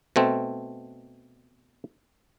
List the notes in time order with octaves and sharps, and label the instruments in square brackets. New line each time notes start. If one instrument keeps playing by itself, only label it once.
[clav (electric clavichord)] B2 A3 C4